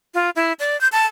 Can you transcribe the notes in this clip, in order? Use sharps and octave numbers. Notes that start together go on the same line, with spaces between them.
F4
E4
D5
G6
A5